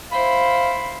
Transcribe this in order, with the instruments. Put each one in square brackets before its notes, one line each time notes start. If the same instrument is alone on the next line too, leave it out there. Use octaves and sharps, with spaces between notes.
[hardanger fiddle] E4 C5 [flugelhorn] F5 [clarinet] B5